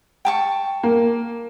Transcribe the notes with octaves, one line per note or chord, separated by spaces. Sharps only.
G5 A5 C#6
A#3